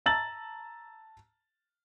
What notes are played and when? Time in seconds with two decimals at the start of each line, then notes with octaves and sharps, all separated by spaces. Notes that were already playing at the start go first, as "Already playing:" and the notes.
0.06 A5 A#5 E6 A6 F#7